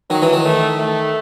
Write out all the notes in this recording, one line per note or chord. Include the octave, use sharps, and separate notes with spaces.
D#3 F#3
E3
D#3
A3
A3